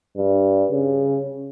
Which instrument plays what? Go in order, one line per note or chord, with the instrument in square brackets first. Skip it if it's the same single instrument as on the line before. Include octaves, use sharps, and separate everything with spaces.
[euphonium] G2
C#3